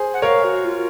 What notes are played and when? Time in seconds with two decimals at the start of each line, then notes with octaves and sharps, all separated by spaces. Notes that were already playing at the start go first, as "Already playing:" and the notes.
Already playing: G#4 C5
0.14 F#5
0.22 A#4 C#5 F5
0.44 F#4
0.64 F4